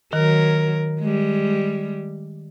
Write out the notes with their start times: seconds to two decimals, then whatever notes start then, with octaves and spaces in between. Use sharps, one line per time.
0.13 D#3 F#3 A#4
1.00 G3 G#3